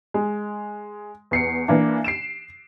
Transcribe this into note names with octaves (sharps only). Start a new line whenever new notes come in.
G#3
E2 C7 C#7
E3 A#3 D4
C7 D7 E7